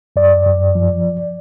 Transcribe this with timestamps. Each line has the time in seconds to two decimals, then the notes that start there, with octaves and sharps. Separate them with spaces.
0.16 F#2 D5
0.46 F#2
0.75 F3